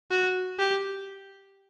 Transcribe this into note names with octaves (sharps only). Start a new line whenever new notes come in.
F#4
G4